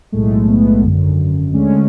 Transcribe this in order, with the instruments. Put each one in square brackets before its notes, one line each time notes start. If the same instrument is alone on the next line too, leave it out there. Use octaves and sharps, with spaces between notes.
[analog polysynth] B1 A2 G#3 A3
B3
G#1 F#2 D3
D2 D3 G#3 C#4